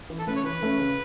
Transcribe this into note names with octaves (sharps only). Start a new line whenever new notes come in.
E3
A4
A3 C#4 B4
C#5
E3 B4
A3 C#4
C#3